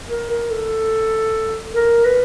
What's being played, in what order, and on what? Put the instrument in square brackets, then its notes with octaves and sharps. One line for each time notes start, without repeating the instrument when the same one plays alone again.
[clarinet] A#4
A#4
A4
A#4
B4